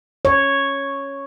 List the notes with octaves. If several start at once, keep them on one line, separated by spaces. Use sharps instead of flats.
C#5